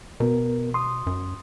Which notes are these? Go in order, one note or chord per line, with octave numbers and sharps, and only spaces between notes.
B2 B3 A#4
C6 D#6
F#2